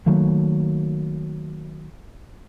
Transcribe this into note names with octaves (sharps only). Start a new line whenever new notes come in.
D#3 F#3 A3 A#3